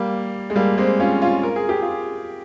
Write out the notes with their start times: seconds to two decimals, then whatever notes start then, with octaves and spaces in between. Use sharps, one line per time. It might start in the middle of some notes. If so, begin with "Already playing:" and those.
Already playing: G3 A#3
0.50 G#3
0.56 G3 A#3
0.78 G#3 C4
1.00 C#4 F4
1.21 C#4 F4
1.43 A#4
1.56 G#4
1.69 G4
1.82 F4 G#4